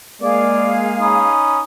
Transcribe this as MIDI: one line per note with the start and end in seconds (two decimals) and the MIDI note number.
0.22 1.27 56
0.22 1.27 58
0.22 1.32 68
0.22 0.75 74
0.22 1.32 77
1.00 1.60 61
1.00 1.62 63
1.00 1.60 83
1.00 1.60 87